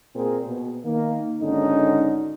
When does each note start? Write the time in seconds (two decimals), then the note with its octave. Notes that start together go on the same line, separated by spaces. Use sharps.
0.15 A#2 C4 G#4 A#4
0.45 B2
0.84 D#3 A#3
1.40 G#1 D3 C#4 D#4